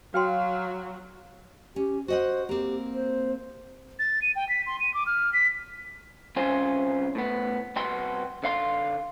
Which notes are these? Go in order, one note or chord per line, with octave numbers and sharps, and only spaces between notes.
F#3 F#4 F5 G5 C6
C#4 G4
F#4 C5 D#5 F#5
A#3 C4 G4
C5
A6
D#7
G5
B6
C6
D#7
D6
F6
B6
C2 C#3 C#4 F4 C5 G#5
A2 B3
C2 B2 B3 F#4 G5 C6
D3 F5 C6